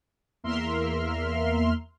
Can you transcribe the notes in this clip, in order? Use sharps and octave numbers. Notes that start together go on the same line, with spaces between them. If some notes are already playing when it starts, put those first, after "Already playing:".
E2 A#3 A#4 E5 C6 F6